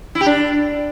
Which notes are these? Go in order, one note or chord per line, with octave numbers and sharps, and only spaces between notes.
E4
G4
D4